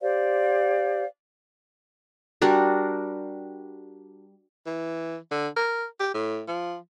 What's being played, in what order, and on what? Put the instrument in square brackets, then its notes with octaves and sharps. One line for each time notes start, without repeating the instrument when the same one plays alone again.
[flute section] G4 C5 D5 F5
[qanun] G3 D4 F#4 A#4
[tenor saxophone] E3
D3
A#4
G4
A2
F3